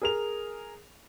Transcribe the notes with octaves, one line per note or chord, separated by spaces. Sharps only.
G#4 A#4 F7